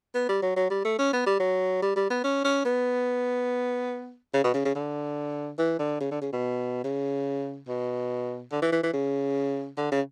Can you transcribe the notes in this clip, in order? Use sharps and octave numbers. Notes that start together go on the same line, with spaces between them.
B3
G3
F#3
F#3
G3
A3
C#4
B3
G3
F#3
G3
G3
B3
C#4
C#4
B3
C#3
B2
C#3
C#3
D3
E3
D3
C#3
D3
C#3
B2
C#3
B2
D3
E3
E3
E3
C#3
D3
C#3